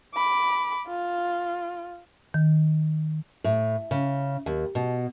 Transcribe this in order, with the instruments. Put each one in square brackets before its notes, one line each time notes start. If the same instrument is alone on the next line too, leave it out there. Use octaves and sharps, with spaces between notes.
[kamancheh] B5 D6
F4
[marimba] D#3
[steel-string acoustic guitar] A2
C#3
D#2
B2